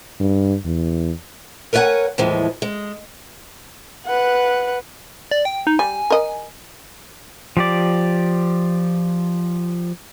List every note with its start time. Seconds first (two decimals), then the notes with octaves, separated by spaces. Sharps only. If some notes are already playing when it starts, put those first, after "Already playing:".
0.20 G2
0.65 E2
1.73 A#4 B4 C#5 D5 F#5 G#5
2.18 D#2 A2 E3 F3 G#3
2.62 G#3
4.06 B4 F#5
5.31 D5
5.45 G5
5.67 D#4
5.79 G3 G#5
6.10 A#4 D#5
7.57 F3 G4 D5